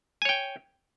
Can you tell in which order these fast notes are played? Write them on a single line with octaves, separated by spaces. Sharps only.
G#5 C#5 G5